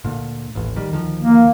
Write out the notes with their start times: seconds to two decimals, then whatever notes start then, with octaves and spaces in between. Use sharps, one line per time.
0.04 D2 A#2
0.55 D#1 A1
0.76 D#3 G3
0.92 D2 D#3 F3
1.22 A#3